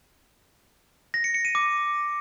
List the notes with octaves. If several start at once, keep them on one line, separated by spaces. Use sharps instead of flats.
A#6
C#7
C#7
D#7
D6